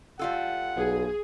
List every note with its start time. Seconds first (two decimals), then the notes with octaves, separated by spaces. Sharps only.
0.19 G3 F4 A4 F#5
0.76 B1 G#4